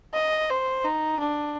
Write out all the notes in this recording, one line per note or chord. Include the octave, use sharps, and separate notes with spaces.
D#5
C5
D#4
D4